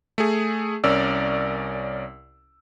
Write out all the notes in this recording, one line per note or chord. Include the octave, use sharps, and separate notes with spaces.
A3 G#4
C2 C#4 A#4 D5 E6